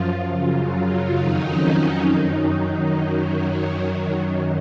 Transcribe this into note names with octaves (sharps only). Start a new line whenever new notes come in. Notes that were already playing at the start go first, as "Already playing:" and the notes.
Already playing: F#2 F3 F4
F#2 C#3 F#3
F2 D#3 F#3 D#4
C#4
D#4
F#2 D#3 F#3
F#2 D#3 F#3
F#2 D#3 F#3